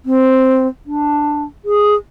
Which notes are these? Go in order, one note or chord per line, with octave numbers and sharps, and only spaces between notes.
C4
D4
G#4